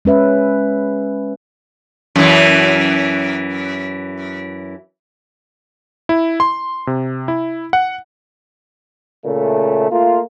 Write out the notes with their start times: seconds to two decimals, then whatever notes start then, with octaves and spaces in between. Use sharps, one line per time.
0.05 G#3 C#4 B4 E5
2.16 F#2 E3
6.09 E4
6.40 C6
6.87 C3
7.28 E4
7.73 F#5
9.24 A#2 C#3 A3
9.91 A3 A#3 F4